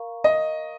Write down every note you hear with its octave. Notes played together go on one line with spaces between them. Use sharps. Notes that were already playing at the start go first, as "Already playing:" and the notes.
Already playing: A#4 F5 A#5 C#6
D#5